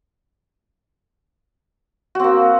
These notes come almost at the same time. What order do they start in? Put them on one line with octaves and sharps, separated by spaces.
F#4 C4 A#3